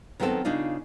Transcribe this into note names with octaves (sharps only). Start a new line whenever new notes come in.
D#3 F#3 B3 C4 F#4 A4
C#3 D4 D#4 F4